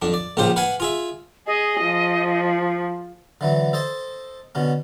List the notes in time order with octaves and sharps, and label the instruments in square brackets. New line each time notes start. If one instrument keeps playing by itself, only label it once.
[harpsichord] F2 D4
D5
A#1 G#2 C#3 F4 G4 C5
B4 F5 F#5 G#5 B5
F4 G#4 E5
[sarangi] G#4 [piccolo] D#5
[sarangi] F3
[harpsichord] D3 E3 F#3
A4 C5 D#5 A5
B2 D3 C#4